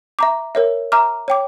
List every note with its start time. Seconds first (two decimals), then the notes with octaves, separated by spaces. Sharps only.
0.19 E5 A#5 D6
0.55 A#4 C#5 E5
0.92 E5 A#5 D6 F6
1.28 C#5 G5 D6